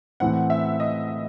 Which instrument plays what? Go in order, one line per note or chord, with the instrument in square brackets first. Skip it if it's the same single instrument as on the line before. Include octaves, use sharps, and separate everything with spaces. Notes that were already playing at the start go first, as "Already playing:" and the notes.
[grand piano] A2 E3 C4 [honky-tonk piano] F#5
[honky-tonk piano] E5
D#5